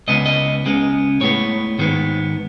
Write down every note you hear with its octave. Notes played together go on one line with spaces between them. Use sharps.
C#2 C#3 G#3 B3 D#5
D#5
C#2 C#3 G#3 B3
A2 G#3 B3 C#5
G#2 D#3 G#3 B3